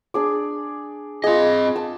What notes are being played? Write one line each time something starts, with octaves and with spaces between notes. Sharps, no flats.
D4 G#4 D5
C4 F4 G#4 D#5
A5